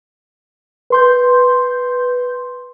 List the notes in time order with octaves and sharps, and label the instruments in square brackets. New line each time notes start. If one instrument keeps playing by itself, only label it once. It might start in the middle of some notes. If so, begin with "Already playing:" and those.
[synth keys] B4 C6 G6